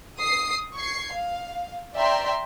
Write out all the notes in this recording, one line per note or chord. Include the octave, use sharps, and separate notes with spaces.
D#6 C7
C#6 G#6 C7
F5
D5 E5 G5 A#5 C6